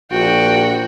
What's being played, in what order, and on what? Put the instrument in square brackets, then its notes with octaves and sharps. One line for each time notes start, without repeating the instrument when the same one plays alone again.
[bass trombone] A#1 [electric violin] F#4 [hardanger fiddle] G5